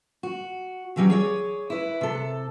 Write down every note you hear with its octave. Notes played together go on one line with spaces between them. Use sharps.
F#4
D3 E3 F#3 G3 C#4
G#4 C#5 D5
E4 B4
C3 A4